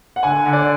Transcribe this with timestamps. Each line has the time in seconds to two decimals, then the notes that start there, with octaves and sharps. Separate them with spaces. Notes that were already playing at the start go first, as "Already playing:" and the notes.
0.16 F#5
0.23 D3 G#5
0.45 D3
0.53 D5